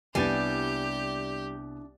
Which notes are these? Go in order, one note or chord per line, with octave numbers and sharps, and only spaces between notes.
C2 G3 B3 D4 E4 G4 G#5 A6